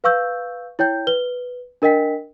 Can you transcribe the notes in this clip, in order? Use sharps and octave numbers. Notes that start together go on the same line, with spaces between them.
B4 F5 C#6 E6 G6
E4 C#5 G5 G6
B4 G7
D4 A#4 D#5 G5 B6